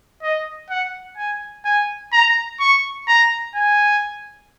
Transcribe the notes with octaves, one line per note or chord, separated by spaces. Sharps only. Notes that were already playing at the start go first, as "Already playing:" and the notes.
D#5
F#5
G#5
G#5
A#5
C#6
A#5
G#5